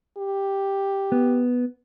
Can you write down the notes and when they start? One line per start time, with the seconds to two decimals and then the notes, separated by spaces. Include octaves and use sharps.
0.17 G4
1.12 B3